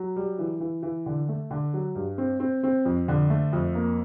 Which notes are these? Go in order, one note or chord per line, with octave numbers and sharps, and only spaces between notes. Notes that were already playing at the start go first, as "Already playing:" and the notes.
Already playing: F#3
G3
E3
E3
E3
D3
A3
D3
F#3
G2
C4
C4
C4
F2
D3
A3
F2
A#3